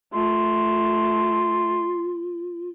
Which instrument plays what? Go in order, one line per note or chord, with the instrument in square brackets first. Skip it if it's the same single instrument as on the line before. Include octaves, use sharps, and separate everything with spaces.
[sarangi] A3 [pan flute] F4 [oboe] C6